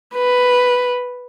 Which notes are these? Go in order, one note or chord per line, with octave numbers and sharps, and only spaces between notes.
B4